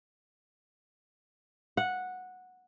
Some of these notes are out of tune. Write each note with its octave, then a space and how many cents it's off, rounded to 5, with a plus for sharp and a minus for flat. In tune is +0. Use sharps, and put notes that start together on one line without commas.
F#5 -10